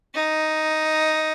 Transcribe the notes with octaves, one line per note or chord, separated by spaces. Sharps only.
D#4